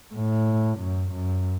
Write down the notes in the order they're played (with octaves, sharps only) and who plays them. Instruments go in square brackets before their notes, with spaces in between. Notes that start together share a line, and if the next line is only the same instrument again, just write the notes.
[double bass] A2
F#2
F#2